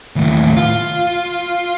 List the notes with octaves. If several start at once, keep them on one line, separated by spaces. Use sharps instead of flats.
D#2 A2
F4